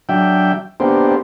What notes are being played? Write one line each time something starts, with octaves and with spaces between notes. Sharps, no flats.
F#3 D4 E5 G5
A#3 B3 D4 G4 C5